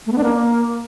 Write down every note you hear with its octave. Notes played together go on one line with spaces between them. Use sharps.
A3
B3
D4
A#3